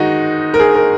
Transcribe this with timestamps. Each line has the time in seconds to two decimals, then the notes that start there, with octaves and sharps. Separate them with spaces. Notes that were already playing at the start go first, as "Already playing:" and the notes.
Already playing: D#3 G#3 D#4 F#4
0.54 A#4
0.60 G#4
0.75 A#4